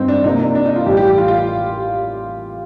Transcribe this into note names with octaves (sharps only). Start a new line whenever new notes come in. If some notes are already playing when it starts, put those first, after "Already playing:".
Already playing: G2 D#3 C4 D#4
D4
C3 F3 A#3 D#4
D4
D4
D#4
F4
A1 A2 G3 G4
G4
G4
F4
F4